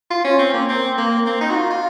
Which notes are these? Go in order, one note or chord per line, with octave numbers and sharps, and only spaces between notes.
F4
C#4
C4
A#3
C4
A#3
C4
D#4
F#4
F4
F4